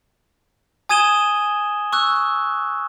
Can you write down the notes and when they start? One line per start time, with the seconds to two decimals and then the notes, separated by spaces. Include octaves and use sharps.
0.89 G#5 D#6 G#6 D#7 E7 G7
1.92 C#6 E6 F#6